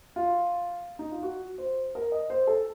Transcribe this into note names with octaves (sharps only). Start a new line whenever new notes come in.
F4
D#4
F4
F#4
C5
A#4
D#5
C5
A4